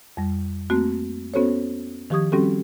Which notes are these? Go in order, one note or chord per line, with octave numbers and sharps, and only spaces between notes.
F2 G3
A3 A#3 C4 F#4
B3 C#4 F#4 A4 C5 C#5
D#3 F3 G4 C#6 D#6 G#6
G3 C4 C#4 F#4 G4 A4